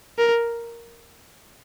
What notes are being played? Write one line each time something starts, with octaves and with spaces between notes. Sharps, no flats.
A#4